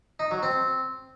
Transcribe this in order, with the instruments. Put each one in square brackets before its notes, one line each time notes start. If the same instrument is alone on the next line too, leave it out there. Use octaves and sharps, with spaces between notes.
[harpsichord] D#4
F#3
C4